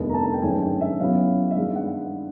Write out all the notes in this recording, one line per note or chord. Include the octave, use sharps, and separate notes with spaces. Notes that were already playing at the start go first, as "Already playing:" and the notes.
Already playing: F1 D#2 D3 G3 B3
A#5
A5
G5
G1 F#2 D#3 G#3 C#4 G#5
G5
E5
F#2 C#3 F#3 B3 E4 F5
E5
G2 D#3 G#3 F5
F#5